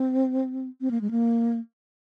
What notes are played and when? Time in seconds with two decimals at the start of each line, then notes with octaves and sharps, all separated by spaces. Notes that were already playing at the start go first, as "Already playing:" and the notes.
Already playing: C4
0.81 C4
0.91 A#3
1.01 G#3
1.11 A#3